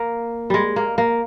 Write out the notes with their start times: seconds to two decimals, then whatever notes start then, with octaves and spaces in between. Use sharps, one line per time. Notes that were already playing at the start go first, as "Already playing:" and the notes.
Already playing: A#3
0.50 G3 G#3
0.76 A#3
0.98 A#3